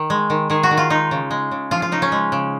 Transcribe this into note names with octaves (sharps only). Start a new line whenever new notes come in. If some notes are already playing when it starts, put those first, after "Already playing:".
Already playing: D#3
G#3
D#3
D#3 G#4
F#4
D#3
F4
G#3 D#4
C#3
G#3
C#3
F3 F4
F4
C#3 D#4
C#4
G#3
C#3